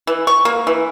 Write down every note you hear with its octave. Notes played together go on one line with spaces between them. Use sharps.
E3
C#6
A#3
E3